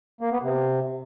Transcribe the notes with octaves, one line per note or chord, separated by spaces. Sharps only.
A#3
B3
C3